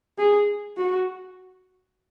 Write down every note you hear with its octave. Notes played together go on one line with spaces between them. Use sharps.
G#4
F#4